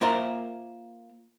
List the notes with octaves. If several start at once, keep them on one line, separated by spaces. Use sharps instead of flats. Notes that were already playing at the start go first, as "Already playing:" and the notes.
A#3 F4 A#4 C5 E5 A#5